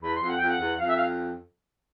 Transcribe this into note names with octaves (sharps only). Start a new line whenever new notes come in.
E2 B5
C6
F2
F#5
F2 G5
F#5
E2
F2 F5
E5
F5